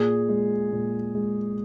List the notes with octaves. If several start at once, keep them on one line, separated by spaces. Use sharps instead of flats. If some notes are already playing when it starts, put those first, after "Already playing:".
Already playing: A#2 G#4
G#3
A#2
G#3